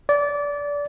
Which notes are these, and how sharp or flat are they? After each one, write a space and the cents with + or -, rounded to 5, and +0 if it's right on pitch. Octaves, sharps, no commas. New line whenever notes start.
D5 -25